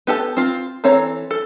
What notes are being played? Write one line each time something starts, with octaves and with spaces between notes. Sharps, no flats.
B3 G4 A4 A5
C4 F4
E3 C4 A4 C#5 A#5
A4